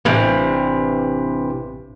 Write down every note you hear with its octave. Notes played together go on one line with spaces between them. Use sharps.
A1 G2 C3 E3